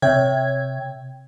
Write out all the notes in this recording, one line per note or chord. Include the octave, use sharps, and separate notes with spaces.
C3 C#5 E5 G5 G#6